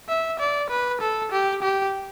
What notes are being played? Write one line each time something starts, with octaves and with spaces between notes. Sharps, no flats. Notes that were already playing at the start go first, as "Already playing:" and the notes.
E5
D5
B4
A4
G4
G4